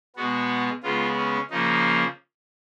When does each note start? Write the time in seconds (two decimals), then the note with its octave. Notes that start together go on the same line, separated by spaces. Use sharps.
0.16 B2 G#3 B3 F#4
0.83 C#3 G#3 B3 F4
1.17 C#4
1.50 C#3 F3 A#3 D#4